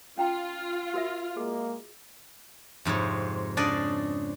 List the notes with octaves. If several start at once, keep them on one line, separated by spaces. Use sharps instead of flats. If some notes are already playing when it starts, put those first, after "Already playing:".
C#4 F4 G5 A#5
F#4 A#4 E5
G#3 A#3 G#4
F2 G#2 C3 C#5
C#3 D4 D5 D#5